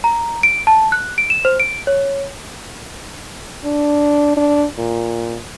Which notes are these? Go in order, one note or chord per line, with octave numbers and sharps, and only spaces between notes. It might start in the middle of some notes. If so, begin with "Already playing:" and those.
A#5
D7
A5
F#6
D7
E7
C5
D7
C#5
D4
D4
A#2